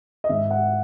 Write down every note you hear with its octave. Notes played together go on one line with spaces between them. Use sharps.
D#5
G#2 E5
F#5